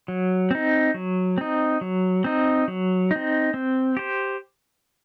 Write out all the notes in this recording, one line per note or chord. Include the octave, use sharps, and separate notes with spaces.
F#3
C4 D#4
F#3
C4 D#4
F#3
C4 D#4
F#3
C4 D#4
C4
G4 C5